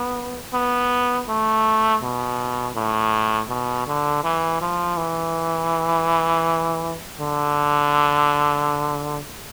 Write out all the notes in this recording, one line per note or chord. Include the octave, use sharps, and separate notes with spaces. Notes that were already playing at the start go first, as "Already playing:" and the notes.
Already playing: B3
B3
A3
B2
A2
B2
D3
E3
F3
E3
D3